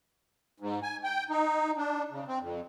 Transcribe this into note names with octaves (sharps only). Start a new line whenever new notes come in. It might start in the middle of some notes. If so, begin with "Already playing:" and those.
G#2
G#5
G5
D#4
D4
C#3
C4
F2